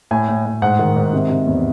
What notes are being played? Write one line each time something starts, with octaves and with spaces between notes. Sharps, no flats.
A2 G#5
A2
A2
G#2 F#5
D#3
G#2
C3
C3
E2